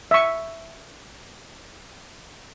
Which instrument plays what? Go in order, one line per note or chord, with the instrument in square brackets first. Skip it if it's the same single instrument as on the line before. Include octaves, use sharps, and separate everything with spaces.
[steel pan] E5 C#6